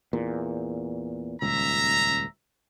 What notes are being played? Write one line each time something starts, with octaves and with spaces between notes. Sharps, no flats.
E2 A#2
D#1 C#2 E5 A#5